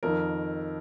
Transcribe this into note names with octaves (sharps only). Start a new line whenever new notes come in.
F2 D#3 A#4